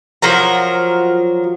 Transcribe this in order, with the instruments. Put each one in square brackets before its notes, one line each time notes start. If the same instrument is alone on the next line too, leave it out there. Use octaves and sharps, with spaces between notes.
[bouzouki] F3 F#3 A#4 A#5